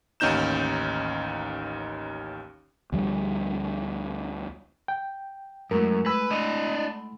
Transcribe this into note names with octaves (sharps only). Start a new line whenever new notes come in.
A1 D#2 C#4 D#4 G6 E7
D2 F3 G3
G5
F#2 G#3 A3 E4 A#4
B4 G#5 B5 E6
D4 D#5 F#5 C6